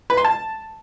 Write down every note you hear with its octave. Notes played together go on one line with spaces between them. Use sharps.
B4
C6
A5